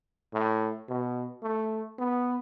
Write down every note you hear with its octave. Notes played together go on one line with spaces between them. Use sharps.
A2
B2
A3
B3